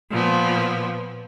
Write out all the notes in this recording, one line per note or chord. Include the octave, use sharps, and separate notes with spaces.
A#2 F3 B3